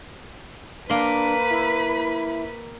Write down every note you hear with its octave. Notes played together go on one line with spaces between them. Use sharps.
A#3 D4 B4 B5 C6
E4